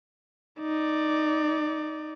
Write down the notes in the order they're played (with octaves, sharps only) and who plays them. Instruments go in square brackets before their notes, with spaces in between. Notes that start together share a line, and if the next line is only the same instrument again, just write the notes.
[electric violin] D#4 D5